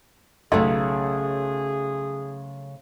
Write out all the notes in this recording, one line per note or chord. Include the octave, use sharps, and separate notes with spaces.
B1 C#3 A3 G#4 A4 C#5